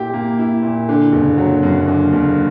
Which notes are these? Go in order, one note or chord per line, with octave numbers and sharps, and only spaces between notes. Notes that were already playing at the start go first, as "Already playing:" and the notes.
Already playing: A#2 E4 G4
A#3
E4
A#2
D3
F#1
F#3
F#2
D3
F#1